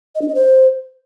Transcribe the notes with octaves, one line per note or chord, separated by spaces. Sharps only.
D#5
D4
D#5
C5